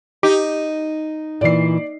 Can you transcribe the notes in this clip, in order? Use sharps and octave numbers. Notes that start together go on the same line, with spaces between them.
D#4 G4
A#2 E3 D5 C7